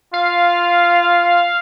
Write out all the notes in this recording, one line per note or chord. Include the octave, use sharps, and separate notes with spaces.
F4 F5